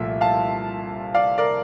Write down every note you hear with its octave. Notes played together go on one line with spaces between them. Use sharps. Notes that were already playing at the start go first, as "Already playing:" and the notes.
Already playing: C2 A#2 F3 A3 E5
F5 A5
D5 F5
A#4 D5